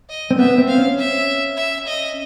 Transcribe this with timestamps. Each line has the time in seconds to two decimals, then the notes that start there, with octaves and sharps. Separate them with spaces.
0.09 D#5
0.31 C4
0.39 B3 E5
0.58 C4
0.68 F5
0.78 C#4
0.98 E5
1.57 E5
1.87 D#5